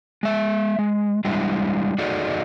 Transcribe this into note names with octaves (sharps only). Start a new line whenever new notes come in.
G#3 E5
G#3
G3 G#3 D4 E4
D#4 F#4 G#4 A4 D5 D#5